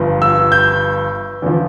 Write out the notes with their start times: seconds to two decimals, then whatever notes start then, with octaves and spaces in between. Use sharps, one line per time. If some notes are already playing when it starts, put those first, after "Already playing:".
Already playing: G1 G2 F3
0.22 E6
0.52 G6
1.42 E2 D3 F3